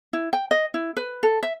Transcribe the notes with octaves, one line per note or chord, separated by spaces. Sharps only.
E4
G5
D#5
E4
B4
A4
E5